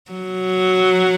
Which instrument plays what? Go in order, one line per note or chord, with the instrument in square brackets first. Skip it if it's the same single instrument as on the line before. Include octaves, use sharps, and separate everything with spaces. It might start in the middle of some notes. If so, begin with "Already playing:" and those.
[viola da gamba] F#3